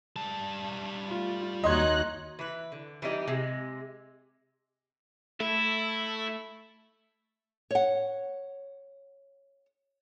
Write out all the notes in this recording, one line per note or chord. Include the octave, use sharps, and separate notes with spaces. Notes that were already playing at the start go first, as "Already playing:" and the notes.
G3 A5
A3 F4
D#2 D#4 F#4 C#5 D#5 C6 F#6 G#6
E3 B4
D3
E3 G3 D#4 G4
C3 G#3
A3 E4
C#5 F#5